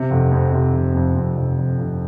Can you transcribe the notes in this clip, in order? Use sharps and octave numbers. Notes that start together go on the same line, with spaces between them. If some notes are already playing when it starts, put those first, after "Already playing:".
Already playing: C3
F1
F2
C3
F1
F2
F2
F1
F1
F1